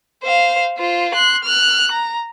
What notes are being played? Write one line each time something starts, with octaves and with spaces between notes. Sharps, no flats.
C5 F5
F4 C5
C6 F#6
F6 F#6
A#5